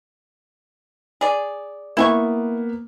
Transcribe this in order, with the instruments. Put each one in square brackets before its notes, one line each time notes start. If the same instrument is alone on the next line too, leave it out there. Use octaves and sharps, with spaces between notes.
[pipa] G#4 D5
[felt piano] A#3 B3 B4 [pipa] E4 G#5 C#6